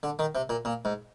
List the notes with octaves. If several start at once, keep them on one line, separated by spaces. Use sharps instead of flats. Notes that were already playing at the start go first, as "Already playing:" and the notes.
D3
D#3
C3
A#2
A#2
G#2